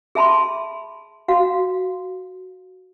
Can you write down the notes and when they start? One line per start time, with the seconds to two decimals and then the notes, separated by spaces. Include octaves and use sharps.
0.15 G#4 E5 A5 B5 C6
1.28 F#4 F5